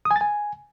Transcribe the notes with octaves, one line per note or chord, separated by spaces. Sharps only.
D#6
G#5
A6
G#5